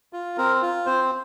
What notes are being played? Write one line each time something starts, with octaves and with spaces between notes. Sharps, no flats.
F4
C4 A#4
F4
C4 C5